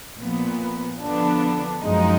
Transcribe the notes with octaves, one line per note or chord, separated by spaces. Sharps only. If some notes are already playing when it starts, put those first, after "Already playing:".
A#2 F3 B3
D3 F3 B3 D4
F#2 F3 G#3 D#4